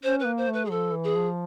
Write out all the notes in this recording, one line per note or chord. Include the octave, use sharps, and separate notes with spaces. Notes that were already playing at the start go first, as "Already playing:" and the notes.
C#4 C5
B4
A#3
C5
A3
B4
G#4
F3 A4
E3
G#4
F3